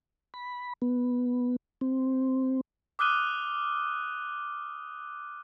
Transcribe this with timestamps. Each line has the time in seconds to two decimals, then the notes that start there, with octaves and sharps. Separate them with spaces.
0.34 B5
0.82 B3
1.81 C4
2.99 D6 D#6 F6 F#6 D#7 G7